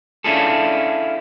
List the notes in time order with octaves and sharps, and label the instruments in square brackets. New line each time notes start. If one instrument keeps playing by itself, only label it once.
[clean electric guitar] C#4 D4 E4 F4 G#4 A4